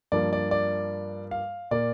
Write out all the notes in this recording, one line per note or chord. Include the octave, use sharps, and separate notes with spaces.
G2 F3 A#3 D5
D5
D5
F5
A#2 A#3 D5